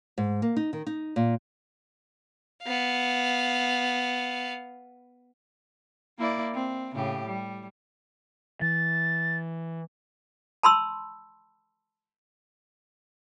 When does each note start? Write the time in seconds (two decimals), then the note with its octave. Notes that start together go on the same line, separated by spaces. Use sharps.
0.18 G#2
0.42 A#3
0.56 D#4
0.73 D#3
0.87 D#4
1.16 A#2
2.63 B3 F5
6.18 A#3 E4 D5
6.54 C4
6.95 A2 C#3 G4
7.27 G3
8.61 E3 A6
10.63 A5 B5 C6 E6